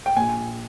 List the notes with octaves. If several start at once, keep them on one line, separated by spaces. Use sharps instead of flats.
G5
A#1 G#5